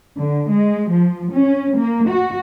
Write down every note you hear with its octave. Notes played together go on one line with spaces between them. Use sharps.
D3
G#3
F3
C#4
A#3
F#4